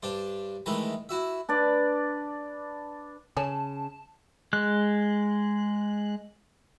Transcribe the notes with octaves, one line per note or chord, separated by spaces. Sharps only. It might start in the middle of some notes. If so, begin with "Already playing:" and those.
G2 D4 C5
D#3 E3 G#3 A3 A#5 B5
E4 F#4 E5
D4 B4 D5
C#3 C#4 C#5 G#5 A5
G#3 F#6